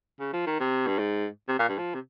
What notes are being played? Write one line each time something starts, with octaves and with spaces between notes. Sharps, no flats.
C#3
F3
D#3
C3
G2
G#2
C3
A#2
G2
F3
C3